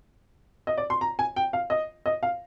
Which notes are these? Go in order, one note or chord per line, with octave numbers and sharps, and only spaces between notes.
D#5
D5
C6
A#5
G#5
G5
F5
D#5
D#5
F5